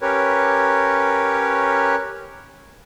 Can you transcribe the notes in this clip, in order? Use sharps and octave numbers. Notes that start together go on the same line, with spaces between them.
C#4 G4 A#4 B4 C#5